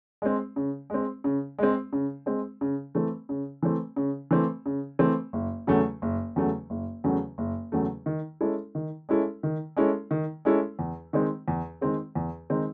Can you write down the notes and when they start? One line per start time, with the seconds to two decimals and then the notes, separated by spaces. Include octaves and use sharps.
0.22 G#3 C4
0.56 C#3
0.90 G#3 C4
1.24 C#3
1.59 G#3 C4
1.93 C#3
2.26 G#3 C4
2.61 C#3
2.95 E3 A3 C4
3.29 C#3
3.63 E3 A3 C4
3.96 C#3
4.31 E3 A3 C4
4.66 C#3
4.99 E3 A3 C4
5.33 F#1
5.67 E2 C#3 F#3 A3
6.02 F#1
6.36 E2 C#3 F#3 A3
6.70 F#1
7.04 E2 C#3 F#3 A3
7.38 F#1
7.72 E2 C#3 F#3 A3
8.06 D#3
8.41 G#3 C#4 E4 A4
8.75 D#3
9.09 G#3 C#4 E4 A4
9.43 D#3
9.77 G#3 C#4 E4 A4
10.11 D#3
10.45 G#3 C#4 E4 A4
10.79 E2
11.13 D#3 G#3 C4 D#4
11.48 E2
11.81 D#3 G#3 C4 D#4
12.15 E2
12.50 D#3 G#3 C4 D#4